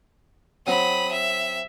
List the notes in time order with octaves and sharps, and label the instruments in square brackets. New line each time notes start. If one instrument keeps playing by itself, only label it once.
[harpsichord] F#3 C4 [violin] B5 D#6
[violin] E5